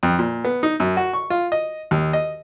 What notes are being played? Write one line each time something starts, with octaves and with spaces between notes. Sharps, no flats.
F2
A#2
B3
D#4
F#2
F#4
C#6
F4
D#5
D#2
D#5